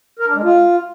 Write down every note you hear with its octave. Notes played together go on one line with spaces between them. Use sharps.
A#4
D4
G#3
F4